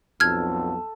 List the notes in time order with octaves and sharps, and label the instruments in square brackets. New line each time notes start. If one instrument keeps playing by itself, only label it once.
[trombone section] B1 F2 [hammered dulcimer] A4 [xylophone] F6 G#6